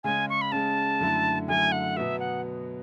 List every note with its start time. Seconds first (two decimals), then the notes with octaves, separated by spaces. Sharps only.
0.04 C#3 G#3 C#4 G#5
0.30 C#6
0.41 B5
0.52 C#3 G#3 C#4 A5
1.00 F#2 D3 A3 E4
1.48 F#2 D3 A3 E4 G#5
1.72 F#5
1.96 B2 F#3 B3 F#4 E5
2.20 F#5